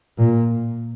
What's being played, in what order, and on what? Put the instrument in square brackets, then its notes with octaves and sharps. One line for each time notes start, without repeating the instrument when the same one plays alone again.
[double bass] A#2